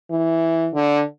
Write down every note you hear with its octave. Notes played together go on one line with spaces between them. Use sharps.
E3
D3